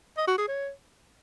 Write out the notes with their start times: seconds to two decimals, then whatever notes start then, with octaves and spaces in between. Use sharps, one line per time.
0.18 D#5
0.28 F#4
0.38 G#4
0.48 C#5